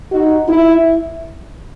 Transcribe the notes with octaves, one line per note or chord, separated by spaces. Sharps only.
D#4 F#4
E4